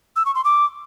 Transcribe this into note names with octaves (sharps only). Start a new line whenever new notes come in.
E6
C#6
C6
D6